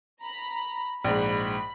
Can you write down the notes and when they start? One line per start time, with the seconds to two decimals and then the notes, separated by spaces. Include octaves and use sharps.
0.23 A#5 B5
1.04 A#1 G#2 B5